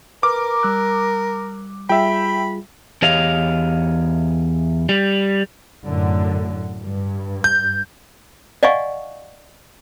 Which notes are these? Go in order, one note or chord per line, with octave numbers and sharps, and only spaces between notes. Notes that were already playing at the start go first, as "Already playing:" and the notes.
A#4 B4 D6 F6
G3 E6 F#6
G3 F4 G#4 E5 G5 B5
E2 G4 C#5 D#5 F5
G3
F#2 A2 D3
G2
G6
D5 D#5 F5 F#5 G#5 C#6